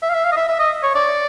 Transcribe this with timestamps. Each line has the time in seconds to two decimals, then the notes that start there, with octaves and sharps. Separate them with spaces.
0.02 E5
0.10 F5
0.14 E5
0.25 F5
0.32 D#5
0.37 E5
0.48 E5
0.59 D#5
0.83 C#5
0.95 D5